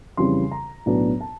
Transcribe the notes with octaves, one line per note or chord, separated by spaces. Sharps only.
F2 C#3 E3 G3 C6
A#5
B1 A2 F#3 B3 D4
A5